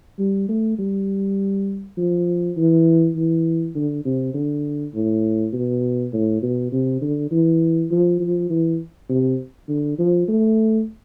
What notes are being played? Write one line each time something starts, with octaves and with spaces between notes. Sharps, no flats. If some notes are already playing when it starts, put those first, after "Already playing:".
G3
A3
G3
F3
E3
E3
D3
C3
D3
A2
B2
A2
B2
C3
D3
E3
F3
F3
E3
C3
D3
F3
A3